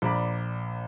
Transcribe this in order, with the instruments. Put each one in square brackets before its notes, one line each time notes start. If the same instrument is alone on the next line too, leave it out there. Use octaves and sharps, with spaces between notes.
[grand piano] A#1 D5 A#5 B5 D6